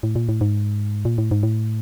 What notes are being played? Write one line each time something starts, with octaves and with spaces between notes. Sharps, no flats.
A2
A#2
A2
G#2
A#2
A2
G#2
A2